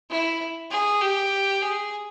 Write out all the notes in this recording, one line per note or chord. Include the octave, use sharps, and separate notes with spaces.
E4
G#4
G4
G#4